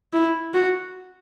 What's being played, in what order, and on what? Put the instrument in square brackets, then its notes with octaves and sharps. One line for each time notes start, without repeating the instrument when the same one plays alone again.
[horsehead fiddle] E4
F#4